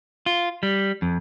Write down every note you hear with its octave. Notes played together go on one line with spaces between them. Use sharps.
F4
G3
F2